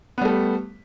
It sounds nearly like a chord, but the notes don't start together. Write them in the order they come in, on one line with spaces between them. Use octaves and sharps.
B3 G3 A3